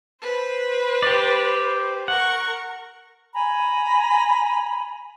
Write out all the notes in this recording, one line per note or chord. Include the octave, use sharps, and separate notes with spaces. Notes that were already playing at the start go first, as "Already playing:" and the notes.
B4 C5
G4 D5
A#4 F#5 C#6
G#5 A#5 B5